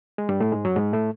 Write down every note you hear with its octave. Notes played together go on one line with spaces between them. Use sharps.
G#3
G2 G3
A2 A3
G#2 G#3
F#2 F#3
G#2 G#3
A2 A3